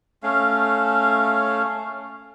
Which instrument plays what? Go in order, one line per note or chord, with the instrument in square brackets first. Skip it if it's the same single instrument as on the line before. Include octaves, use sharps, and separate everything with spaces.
[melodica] A3 C#4 F5